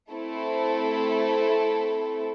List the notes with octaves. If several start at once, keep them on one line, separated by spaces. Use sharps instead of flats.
A3 C4 E4 A4